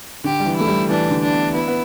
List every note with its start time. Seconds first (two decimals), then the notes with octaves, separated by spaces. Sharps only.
0.24 D3 G4
0.40 G3
0.46 E3
0.56 A3 E4
0.67 G3
0.89 E3 D4
1.11 D3
1.22 D4
1.32 B3
1.54 B3 E4
1.68 B3